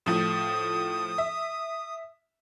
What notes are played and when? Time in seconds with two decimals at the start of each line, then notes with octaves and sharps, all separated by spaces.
0.06 A2 F3 D#6
1.18 E5